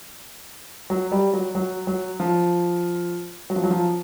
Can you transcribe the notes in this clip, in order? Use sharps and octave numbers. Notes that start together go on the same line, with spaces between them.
F#3
G3
F#3
F#3
F#3
F3
F#3
F3
F#3
F3